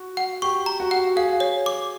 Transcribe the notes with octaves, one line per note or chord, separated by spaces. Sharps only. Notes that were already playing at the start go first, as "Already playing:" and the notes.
Already playing: F#4
F#5
G4 C#6
A#5
F#4
F#5
G#4 F5
C#5
D6